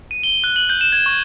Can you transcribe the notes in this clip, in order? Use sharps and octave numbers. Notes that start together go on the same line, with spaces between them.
D#7
G7
F#6
F#7
G6
E7
G#6
C#6